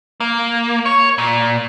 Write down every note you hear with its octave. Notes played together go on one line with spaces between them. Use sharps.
A#3
C#5
A#2